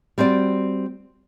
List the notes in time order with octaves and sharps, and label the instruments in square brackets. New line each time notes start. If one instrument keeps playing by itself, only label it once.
[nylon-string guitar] G3 C4 F#4 D5